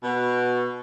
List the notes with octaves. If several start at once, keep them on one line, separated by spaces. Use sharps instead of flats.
B2